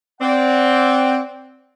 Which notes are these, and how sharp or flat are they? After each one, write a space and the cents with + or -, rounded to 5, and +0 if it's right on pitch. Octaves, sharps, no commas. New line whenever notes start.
C4 +0 D5 -20 F#5 +0